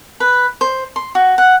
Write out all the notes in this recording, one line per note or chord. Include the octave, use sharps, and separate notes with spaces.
B4
C5
C6
F#4
F#5